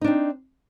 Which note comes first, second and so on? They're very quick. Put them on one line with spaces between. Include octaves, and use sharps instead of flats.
D#4 D4 C4